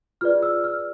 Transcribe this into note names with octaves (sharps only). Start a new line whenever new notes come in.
F4 G#4 B4 D5 F6
E6
F6